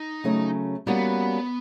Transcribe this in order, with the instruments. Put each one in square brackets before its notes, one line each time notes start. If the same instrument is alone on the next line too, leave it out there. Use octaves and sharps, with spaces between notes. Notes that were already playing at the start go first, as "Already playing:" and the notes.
Already playing: [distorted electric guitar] D#4
[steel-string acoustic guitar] C#3 F#3 A3 C#4
[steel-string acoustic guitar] G3 A#3 C#4 F#4 [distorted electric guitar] B3